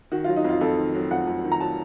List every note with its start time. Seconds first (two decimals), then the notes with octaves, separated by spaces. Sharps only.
0.11 D#3 F#4
0.24 F4
0.28 F#3
0.36 D#4
0.44 F2 F4
0.61 F2 A4
0.78 D#3
0.95 F#3
1.11 F2 F#5
1.27 F2
1.44 D#3
1.52 A#5
1.60 F#3 A5